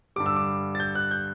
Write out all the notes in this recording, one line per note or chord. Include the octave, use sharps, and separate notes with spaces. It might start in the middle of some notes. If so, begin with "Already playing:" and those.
G2 D3 G3 D6
E6
D6
A6
G6
F#6
G6